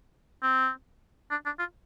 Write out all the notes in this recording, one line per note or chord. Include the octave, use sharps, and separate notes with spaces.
C4
D4
D4
F4